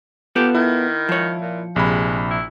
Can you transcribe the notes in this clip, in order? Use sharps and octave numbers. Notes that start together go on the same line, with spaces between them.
B3 F4 G4 A4
D#3 E4
F3 C#5
A#2
A#1 C3 G#3 B5
E4